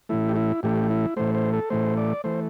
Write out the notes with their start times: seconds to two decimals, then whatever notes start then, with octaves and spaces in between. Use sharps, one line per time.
0.09 A2 E3 A3 E4
0.28 G4
0.36 E4
0.63 A2 E3 A3 G4
0.90 E4
1.17 A2 E3 A3 C5
1.34 C5
1.53 A4
1.70 A2 E3 A3 C5
1.97 D5
2.24 E3 A3 C5